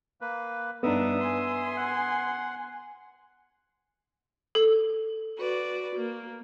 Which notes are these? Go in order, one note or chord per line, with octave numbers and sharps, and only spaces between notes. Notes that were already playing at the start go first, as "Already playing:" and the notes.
A#3 B4
G2 B3 D4 D#4 E5 D#6
G#5 C6
F#5
A4
F#4 B4 D5
A#3